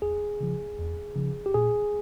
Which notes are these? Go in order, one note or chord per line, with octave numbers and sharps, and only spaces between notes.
E2 G#4
C#3 F3
E2
C#3 F3
G4
A#2 G#4